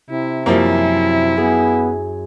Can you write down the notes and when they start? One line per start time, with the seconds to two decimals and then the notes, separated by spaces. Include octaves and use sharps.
0.10 C3 E4
0.46 F#2 F3 G3 A#3 E4
1.38 B3 G#4